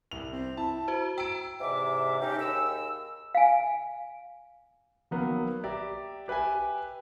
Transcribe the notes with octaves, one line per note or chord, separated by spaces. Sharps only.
C2 F7
C4
E4 A5
F#4 C5
G5 A#5 E6 D7
E2 G#2 C3 E5 D6
A3 C#4 D#4 G4
D#2 G#4 E6
F5 G#5
D#3 F#3 A#3 B3
G4 D5 E5 A#5
G4 B4 E5 G5 G#5